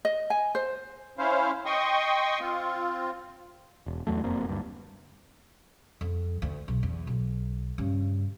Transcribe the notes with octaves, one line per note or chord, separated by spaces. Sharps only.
D#5
G#5
C5
C#4 E4 C5 F5
D#5 G5 C6 C#6 D#6
C4 F4
E1
E2 G2 F#3 A3
F1 F#2 A#3 C4
D2 G2
F2
D2
B1
E2
B1
G2 C#3